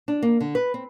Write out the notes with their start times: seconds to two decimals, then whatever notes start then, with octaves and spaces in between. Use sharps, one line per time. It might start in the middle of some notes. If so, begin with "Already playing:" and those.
0.08 D4
0.22 A#3
0.40 D3
0.55 B4
0.74 C4